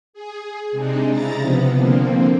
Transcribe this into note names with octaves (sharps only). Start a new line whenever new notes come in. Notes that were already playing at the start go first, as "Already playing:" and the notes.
G#4
C3 G#3 D4 D#4
C#3 E4 A#5 A6
C3 F3 B3
D3 F3 A#3 C4